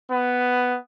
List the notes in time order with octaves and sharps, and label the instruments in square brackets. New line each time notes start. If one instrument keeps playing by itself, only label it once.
[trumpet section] B3